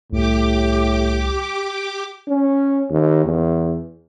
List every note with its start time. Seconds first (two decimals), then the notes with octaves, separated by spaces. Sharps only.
0.12 C2 A2 G4 D6
2.28 C#4
2.90 D#2
3.25 E2